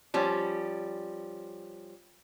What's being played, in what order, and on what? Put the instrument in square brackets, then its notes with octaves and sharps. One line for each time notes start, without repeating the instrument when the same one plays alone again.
[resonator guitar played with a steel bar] F3 G3 C#4